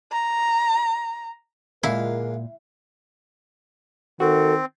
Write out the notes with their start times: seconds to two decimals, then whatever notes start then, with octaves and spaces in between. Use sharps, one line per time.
0.12 A#5
1.83 A#2 D3 G#3 E4 A#4 F5
4.20 D#3 C4 F#4 A4